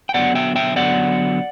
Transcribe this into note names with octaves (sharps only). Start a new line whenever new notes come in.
G5
D3 F#3 B3 D5 F#5
E5 G5
E5 G5
D3 F#3 B3 D5 F#5